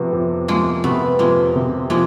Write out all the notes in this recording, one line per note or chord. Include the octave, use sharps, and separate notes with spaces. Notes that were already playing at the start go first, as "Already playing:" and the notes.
Already playing: C3 F3 A3 B3
F2
F3 G#3 A#3
C3 A3 B3
F2 G#3 A#3
C3
F3 G#3 A#3